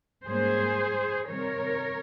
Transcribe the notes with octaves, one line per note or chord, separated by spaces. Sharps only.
G#2 G3 A#3 C#4 G#4 C5
C3 D#3 G3 C4 A#4 C#5